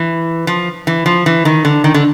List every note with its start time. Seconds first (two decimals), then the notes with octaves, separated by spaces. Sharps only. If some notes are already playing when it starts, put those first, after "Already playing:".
Already playing: E3
0.47 F3
0.87 E3
1.06 F3
1.26 E3
1.45 D#3
1.65 D3
1.84 D#3
1.94 D3